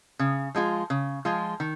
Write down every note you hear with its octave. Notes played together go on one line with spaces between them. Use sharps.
C#3
F3 G#3 F4
C#3
F3 G#3 F4
D#3